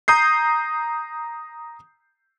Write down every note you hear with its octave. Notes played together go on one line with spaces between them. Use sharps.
A#5 D#6 G6 C7